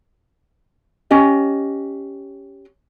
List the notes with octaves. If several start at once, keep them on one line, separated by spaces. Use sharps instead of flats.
C#4 G4 D#5